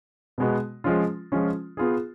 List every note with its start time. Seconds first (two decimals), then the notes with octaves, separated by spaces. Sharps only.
0.38 B2 G#3 B3 F#4
0.84 F3 G#3 C#4 F4
1.32 F3 G#3 C#4 F4
1.77 B3 F4 G#4